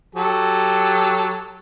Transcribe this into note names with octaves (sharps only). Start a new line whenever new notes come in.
F#3 G4 A4